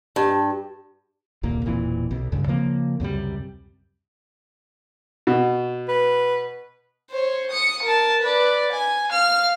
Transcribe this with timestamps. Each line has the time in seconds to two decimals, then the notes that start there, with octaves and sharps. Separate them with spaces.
0.16 G2
1.43 D#1 C2 A#2 A#3
1.65 E1 A#2 E3 C4
2.11 B1
2.32 C#2 G2 C#3
2.48 C#3 F3 A#3 C4
3.00 C#2 F#2 C3 G3
5.27 B2
5.88 B4
7.11 C5 C#5
7.51 D#6 C#7
7.82 A#4 A5
8.22 B4 D5
8.72 G#5
9.10 F5 F6